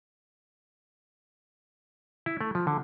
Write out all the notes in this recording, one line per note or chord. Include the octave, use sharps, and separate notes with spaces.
E4
A3
F3
D3